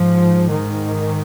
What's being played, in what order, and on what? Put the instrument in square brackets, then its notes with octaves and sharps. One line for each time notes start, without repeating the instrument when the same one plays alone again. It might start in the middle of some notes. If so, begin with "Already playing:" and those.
Already playing: [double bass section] G#2 F3
D#3